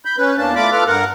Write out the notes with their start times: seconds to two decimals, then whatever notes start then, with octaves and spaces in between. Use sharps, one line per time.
0.05 B5 G6
0.18 C#4 B4
0.38 E2 A#3 D4 A5
0.55 A3 F4 D5 B5 D6
0.72 F4 A4 B4 D6 F6
0.87 G2 A#4 F#5